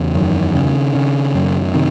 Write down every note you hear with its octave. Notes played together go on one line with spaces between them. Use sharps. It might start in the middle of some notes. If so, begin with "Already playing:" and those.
Already playing: E2 C#3
F#2 D#3
C#3
C#3
F#2
C3 D#3